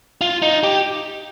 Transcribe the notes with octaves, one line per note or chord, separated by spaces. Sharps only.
F4
D#4
G4